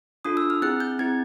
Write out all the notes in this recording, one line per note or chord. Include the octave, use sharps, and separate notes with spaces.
D4 F4 A4 D#6
E6
F6
C4 E4 G#4 F#6
G6
C4 E4 G#4 G#6